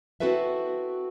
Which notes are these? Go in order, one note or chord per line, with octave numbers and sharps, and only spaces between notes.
C4 E4 F#4 A4 B4 E5